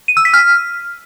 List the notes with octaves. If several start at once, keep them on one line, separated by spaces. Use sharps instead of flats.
D#7
E6
B6
F6